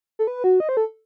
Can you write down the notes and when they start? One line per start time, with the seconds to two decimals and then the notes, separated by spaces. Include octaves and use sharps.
0.19 A4
0.27 B4
0.44 F#4
0.60 D#5
0.69 C5
0.77 A4